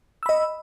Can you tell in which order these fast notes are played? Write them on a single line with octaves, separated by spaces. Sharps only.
E6 B5 D#5